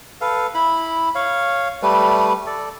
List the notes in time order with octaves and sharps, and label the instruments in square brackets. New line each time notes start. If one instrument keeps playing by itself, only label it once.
[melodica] A4 B4 F5
E4 B5
C#5 F5
G3 A3 B4
A4 D5